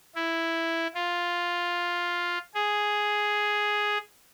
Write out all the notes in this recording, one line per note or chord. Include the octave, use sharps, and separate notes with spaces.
E4
F4
G#4